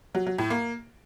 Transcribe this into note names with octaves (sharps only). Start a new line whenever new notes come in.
F#3
F#3
A2
A#3